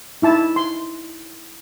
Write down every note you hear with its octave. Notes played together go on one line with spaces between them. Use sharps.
D#4 E4 A5
C6